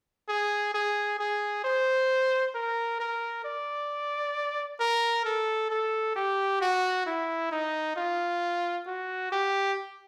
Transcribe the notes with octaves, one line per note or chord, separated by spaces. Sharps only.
G#4
G#4
G#4
C5
A#4
A#4
D5
A#4
A4
A4
G4
F#4
E4
D#4
F4
F#4
G4